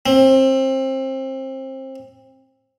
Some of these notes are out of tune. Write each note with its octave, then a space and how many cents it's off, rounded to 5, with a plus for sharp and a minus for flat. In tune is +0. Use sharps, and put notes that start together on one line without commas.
C4 +25